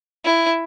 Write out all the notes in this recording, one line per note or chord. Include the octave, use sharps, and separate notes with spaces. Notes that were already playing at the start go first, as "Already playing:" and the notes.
E4